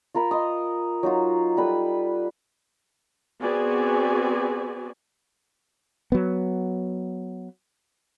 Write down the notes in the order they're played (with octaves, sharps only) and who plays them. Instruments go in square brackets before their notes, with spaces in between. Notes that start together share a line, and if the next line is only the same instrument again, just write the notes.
[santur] F4 A#4 A#5 B5
D#5 C6 D#6
F#3 D#4 F4
G3 A4 B4 B5
[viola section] B3 C4 F#4 G#4 D5 G#5
[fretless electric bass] F#3 B3